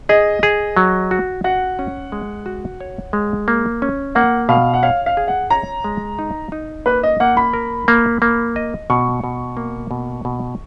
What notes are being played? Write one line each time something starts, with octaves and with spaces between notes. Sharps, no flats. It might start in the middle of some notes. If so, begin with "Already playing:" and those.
G#4 D#5
G#4
F#3
F#4
F#4 F#5
C#4
G#3
F#4
C#5
G#3
A#3
C#4
A#3 F#5
B2 F5
F#5
C#5 F5
F5
G#4
F#5
C#5 A#5
G#3
D#4
D#4
A#3 B4
D#5
A#3 F#5
B5
A#4
A#3
A#3
D#5
B2 C#6
B2
A#3
B2
B2